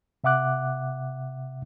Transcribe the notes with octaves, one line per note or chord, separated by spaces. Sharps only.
C3 E5 F#5 D6 F#6